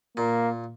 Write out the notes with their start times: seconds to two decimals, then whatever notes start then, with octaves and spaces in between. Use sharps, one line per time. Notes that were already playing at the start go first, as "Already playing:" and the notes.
0.17 A#2 A#3